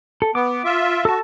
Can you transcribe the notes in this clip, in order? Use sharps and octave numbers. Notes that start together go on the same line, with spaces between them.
A4
B3 D6
F4 E5
F#4 A4 A5